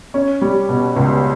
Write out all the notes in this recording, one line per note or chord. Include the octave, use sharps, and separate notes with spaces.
C#4
G3
B2
C#2